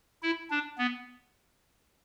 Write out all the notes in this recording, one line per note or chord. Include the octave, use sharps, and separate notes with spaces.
E4
D4
B3